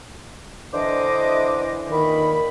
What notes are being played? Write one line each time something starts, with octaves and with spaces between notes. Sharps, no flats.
D3 E3 D4 C5 D#5 D6
A#2 D#3 B5